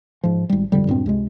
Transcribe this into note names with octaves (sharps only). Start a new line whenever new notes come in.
G#2 F3
G#1 G3
G#1 F2 D3 G3
E1 G2 A#2 C4
C#2 C3 G#3